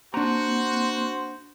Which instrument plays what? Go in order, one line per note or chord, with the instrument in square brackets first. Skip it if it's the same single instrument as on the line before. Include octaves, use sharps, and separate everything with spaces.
[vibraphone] A#3 C4 [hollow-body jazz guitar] D4 A#5 [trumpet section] F#4 [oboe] C5